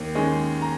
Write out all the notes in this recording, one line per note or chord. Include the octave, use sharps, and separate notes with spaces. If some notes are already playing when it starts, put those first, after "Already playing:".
Already playing: D#2 D#3
D#3 G#3 C#4
A#5